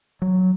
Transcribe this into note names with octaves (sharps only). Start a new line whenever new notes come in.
F#3